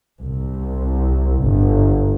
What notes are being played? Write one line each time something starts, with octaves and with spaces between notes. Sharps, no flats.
C2
G1